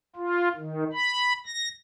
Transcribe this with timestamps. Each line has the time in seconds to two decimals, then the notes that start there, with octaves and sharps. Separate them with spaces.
0.16 F4
0.55 D#3
0.93 B5
1.46 A#6